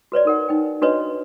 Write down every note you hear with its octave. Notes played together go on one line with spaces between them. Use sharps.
F#4 B4 C#5 D5
D#4 A#4 F#5
D#4 G5
D4 F#4 B4 C#5 D#5